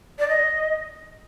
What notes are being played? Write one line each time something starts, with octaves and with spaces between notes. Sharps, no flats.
D5
D#5